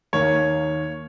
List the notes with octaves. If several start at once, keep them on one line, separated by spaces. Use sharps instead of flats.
D#2 D#3 A#3 C#5